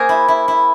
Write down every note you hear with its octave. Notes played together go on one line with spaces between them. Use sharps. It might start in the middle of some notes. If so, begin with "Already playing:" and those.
Already playing: A#3 G#4 A#4 C5
E4
E4
E4